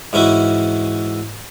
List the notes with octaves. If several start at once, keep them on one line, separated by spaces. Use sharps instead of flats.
G#2 E3 C#4 E4 F#4